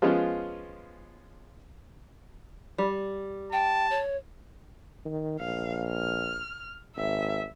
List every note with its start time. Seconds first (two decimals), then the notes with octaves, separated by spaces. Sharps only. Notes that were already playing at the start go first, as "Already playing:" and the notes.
0.02 F3 G#3 B3 C#4 F4
2.78 G3
3.52 G5 A5
3.90 C#5
5.05 D#3
5.40 A#1 F5
5.90 F6
6.96 G#1 E5